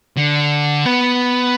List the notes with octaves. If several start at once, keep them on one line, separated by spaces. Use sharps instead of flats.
D3
B3